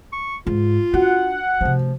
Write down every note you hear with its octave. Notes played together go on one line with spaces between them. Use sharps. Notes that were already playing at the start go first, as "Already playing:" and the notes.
C#6
G#2 F4
D4 F#4 F#5
C3 F3 A3